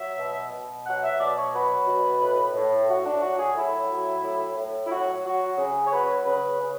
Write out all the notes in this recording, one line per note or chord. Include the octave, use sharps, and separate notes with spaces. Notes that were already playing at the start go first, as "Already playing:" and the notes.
Already playing: F#3 E5
B2
B2
F#3 F#5
E5
B2 D5
C#5
F#3 B4
B2
A2
A2
A2 F#4
D4
F#3 F#4
G#4
A2 E4
F#3
A2
A2
E4
F#3 F#4
F#3 F#4
C#3 G#4
C#5
F#3 B4
C#3 B4
C#3